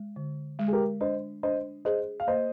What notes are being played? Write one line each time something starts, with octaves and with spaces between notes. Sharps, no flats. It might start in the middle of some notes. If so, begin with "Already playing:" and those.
Already playing: G#3
D3
G#3
G#4
G4 A#4
D4 C5 D#5
D4 C5 D#5
G#4 C5 D#5
F5
A#3 C5 D#5